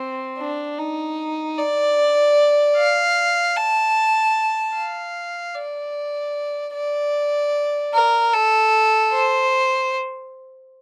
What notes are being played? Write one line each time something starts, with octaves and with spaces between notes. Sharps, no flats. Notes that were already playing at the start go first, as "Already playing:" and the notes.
Already playing: C4
D4
D#4
D5
F5
A5
F5
D5
D5
A#4
A4
C5